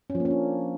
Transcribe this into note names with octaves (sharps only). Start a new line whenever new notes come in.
C#4
F3
A#3
C#4
D4